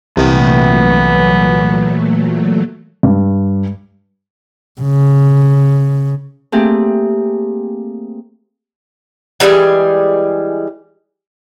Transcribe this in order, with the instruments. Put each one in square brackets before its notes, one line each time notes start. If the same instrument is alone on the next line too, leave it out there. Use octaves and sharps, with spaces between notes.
[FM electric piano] C2 [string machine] A#2 F#3 A3 [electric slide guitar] E3 D#5 [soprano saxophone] B3
[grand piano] G2
[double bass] C#3
[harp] A3 A#3 C4 G4 G#4
[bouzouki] E3 G3 G#3 G#4